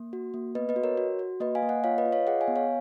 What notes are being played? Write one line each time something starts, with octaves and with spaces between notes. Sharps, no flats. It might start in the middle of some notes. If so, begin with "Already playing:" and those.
Already playing: A#3
F#4
A#3
B3 B4 D#5
B4 D#5
F#4
A#4 C#5
F#4
F#4
A#3 B4 D#5
F5 G#5
A#3
D#5 F#5
F4 C#5 F5
B4 D#5
F4
C#5 F5
G#4 D#5 F#5
F5 G#5
B3
C#5 F5